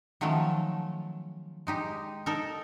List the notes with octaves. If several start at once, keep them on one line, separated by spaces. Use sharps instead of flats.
D#3 F3 F#3 A3 C#4
G#3 D#4 G4
D#4 A4 A#4